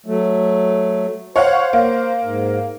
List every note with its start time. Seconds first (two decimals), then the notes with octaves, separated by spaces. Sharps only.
0.06 F#3 A3
1.36 C5 C#5 F5 F#5
1.73 A#3
2.23 G#2